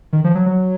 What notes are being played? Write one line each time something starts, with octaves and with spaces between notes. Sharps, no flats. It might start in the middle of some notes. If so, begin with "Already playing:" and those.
D#3
F3
F#3
F#3